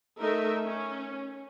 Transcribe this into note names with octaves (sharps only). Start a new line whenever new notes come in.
A3 D#4 A#4 E5
C#4